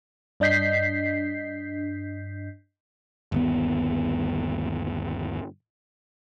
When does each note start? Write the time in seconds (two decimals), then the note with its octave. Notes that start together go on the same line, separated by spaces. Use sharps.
0.40 G2 D4 D#5 G6 B6 C7
3.32 G1 D#2 B3